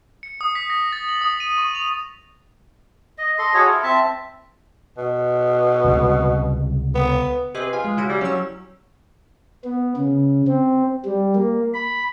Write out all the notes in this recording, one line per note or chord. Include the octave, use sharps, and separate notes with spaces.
C#7
D#6
B6
A#6
A6
F#7
D#6
D#7
C#6
F7
D#5
A4 D#5 C6
F#4 G#4 A4 C#5
E4 F4 A4
C4 E5 A5
B2
C#2 C3 G3
B3
C3 G#4 B4 D#5
F4 G#5
G#3
C#3 E4 F#4
G3
F#3 C#4 G4 E6
B3
C#3
C4
G3
A#3
B5